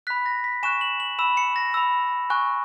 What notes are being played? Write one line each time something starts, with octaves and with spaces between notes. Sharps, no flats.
B5 F#6 B6
A#6
B6
G#5 C#6 F#6 E7
F#7
F#7
B5 E6 E7
C#7
A#6
B5 E6
G#5 C#6 F#6